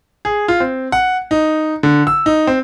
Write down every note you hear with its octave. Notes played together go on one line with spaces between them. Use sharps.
G#4
F4
C4
F#5
D#4
D3
E6
D#4
C4